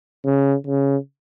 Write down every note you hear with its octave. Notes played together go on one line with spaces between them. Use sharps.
C#3
C#3